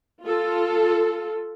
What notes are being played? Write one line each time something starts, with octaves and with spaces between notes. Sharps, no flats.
F4 A4